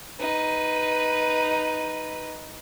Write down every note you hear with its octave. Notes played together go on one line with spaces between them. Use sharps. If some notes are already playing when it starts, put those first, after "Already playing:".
D#4 B4